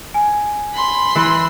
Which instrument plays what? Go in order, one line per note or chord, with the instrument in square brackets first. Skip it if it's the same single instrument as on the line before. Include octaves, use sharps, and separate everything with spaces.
[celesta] G#5
[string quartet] B5 C6
[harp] E3